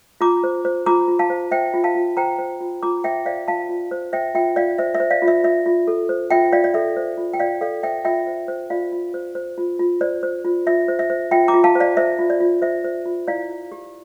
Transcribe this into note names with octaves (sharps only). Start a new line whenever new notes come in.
F4 A#5 D6
C5
C5
F4 A#5 D6
F4
F5 A5
C5
C5 E5 G5
F4
F5 A5
F4
C5 G5 A#5
C5
F4
F4 A#5 D6
C5 E5 G5
C5 D5 F5
F4 F5 A5
F4
C5
C5 E5 G5
F4 E5 G5
F4 D5 F5
C5 E5
E5
C5
D5 F5
F4
E5
F4 E5
F4
A4
C5
F4 E5 G5
F4 D5 F5
D5
A4 E5
C5
F4
G5
F4 D5 F5
A4 D5 F5
C5 E5 G5
F4 E5 G5
C5
C5
F4 D5 F5
F4
C5
C5
F4
F4
C5 D5
C5
F4
F4 E5
C5
E5
C5
F4 E5 G5
A#5 D6
F4
F5 A5
C5
D5 F5
C5 E5
F4
D5
F4
C5 E5
C5
F4
E4 D5 F5
E4
G4